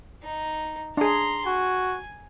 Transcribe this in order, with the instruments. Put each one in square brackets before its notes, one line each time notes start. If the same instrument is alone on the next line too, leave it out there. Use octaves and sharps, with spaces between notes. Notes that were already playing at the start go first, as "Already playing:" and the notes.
[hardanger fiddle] D#4
[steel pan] D4 G#4 [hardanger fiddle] A#5 C6
[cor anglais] F#4 [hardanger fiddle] G#5